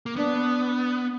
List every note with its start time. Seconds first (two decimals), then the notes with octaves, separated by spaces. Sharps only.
0.06 A#3
0.16 B3 D4